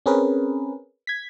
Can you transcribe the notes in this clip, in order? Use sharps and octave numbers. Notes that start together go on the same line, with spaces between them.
C4 C#4 G#4 A#4 B4
G#6 B6